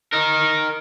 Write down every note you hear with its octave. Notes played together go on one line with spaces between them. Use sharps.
D#4 A#4